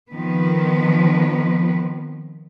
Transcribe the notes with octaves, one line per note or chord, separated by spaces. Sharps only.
D#3 F3 B3 C4 B4